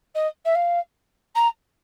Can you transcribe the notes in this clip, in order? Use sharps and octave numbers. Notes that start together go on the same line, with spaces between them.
D#5
E5
F5
A#5